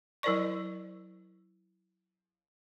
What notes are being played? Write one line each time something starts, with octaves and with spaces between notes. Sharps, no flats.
F#3 E4 A#4 C5 D5 C#6